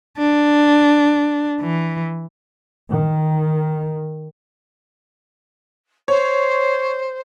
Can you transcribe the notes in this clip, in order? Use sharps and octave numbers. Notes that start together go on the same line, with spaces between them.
D4
E3
D#3
C5 C#5